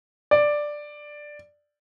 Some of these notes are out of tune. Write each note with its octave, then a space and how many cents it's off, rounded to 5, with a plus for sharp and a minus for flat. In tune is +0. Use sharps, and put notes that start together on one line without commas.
D5 +5